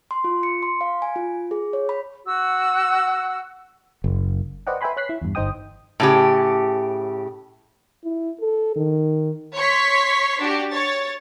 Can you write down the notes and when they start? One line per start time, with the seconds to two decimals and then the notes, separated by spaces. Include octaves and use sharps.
0.11 C6
0.24 F4
0.43 C#7
0.63 C6
0.81 F5
1.02 G#5
1.16 F4
1.51 G#4
1.73 C#5
1.89 B5
2.25 F#4 F#5 E6
4.04 F#1
4.67 B4 C5 D5 D#5 F#5 G5
4.81 B4 E5 G5 G#5 B5 C6
4.97 C#5 F#6 B6 C7
5.09 E4
5.22 E2 G2
5.35 G1 D#4 C5 D#5 G5 D#6
6.00 A2 C#3 G4
8.04 E4
8.41 A4
8.76 D#3
9.57 C#5 C6 C#6 B6
10.40 D4 F#4 G4
10.70 C#5 A6